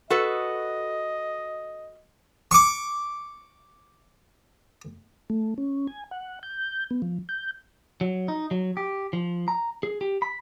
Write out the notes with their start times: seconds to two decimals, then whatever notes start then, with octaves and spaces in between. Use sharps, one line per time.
0.10 F#4 A4 B4 D#5
2.51 C#6 D6
5.30 A3
5.58 C#4
5.87 G#5
6.11 F#5
6.43 G6
6.91 B3
7.02 F3
7.29 G6
8.01 F#3
8.28 D#4
8.51 F#3
8.77 G4
9.13 F3
9.48 A#5
9.83 G#4
10.01 G4
10.22 B5